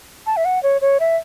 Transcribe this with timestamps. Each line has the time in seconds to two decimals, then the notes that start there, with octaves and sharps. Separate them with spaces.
0.26 A5
0.37 E5
0.45 F#5
0.63 C#5
0.81 C#5
1.00 E5